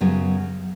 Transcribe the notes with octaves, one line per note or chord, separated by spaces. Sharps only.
F#2 C#3 F#3 B3